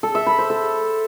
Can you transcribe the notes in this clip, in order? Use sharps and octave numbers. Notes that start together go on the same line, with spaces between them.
A4
E5
B5
C5
A4